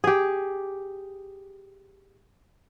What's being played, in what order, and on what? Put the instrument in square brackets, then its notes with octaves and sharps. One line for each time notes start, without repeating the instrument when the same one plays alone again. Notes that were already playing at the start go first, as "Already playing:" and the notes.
[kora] G4 G#4